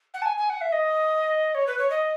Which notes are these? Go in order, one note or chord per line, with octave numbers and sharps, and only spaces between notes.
F#5
A5
G#5
G#5
F#5
E5
D#5
C#5
B4
C#5
D#5